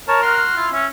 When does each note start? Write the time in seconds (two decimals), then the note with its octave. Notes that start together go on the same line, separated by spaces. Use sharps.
0.08 A#4 C#5 A5
0.22 F#4 C6 F6
0.56 E4 F4
0.72 C#4 E5